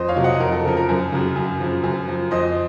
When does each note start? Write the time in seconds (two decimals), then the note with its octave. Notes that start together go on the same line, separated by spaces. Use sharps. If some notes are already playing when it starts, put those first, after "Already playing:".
Already playing: F2 C5 D#5
0.08 C#5 F5
0.16 C3 F#3
0.24 D#5 F#5
0.40 F2 A#4
0.52 A4
0.65 C#3 F3 A#4
0.77 A#4
0.89 F#2
1.12 C#3 F#3
1.36 F#2
1.60 C#3 F3
1.84 F#2
2.08 F3
2.31 F2 C5 D#5